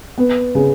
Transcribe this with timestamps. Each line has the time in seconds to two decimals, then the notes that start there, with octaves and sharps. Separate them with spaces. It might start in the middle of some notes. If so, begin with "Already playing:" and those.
0.18 B3
0.55 C#3